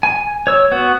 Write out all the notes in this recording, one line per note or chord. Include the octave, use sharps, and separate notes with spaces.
G#5
C#5 E6
B3 F#4